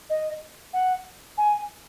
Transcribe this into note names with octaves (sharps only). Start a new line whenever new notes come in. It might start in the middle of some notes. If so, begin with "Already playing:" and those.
D#5
F#5
G#5